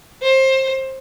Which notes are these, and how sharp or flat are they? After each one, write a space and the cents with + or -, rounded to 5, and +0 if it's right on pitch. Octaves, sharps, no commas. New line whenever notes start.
C5 +25